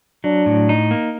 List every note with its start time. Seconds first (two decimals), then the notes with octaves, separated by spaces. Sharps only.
0.24 F#3 D4
0.46 A2
0.69 D#4
0.91 A#3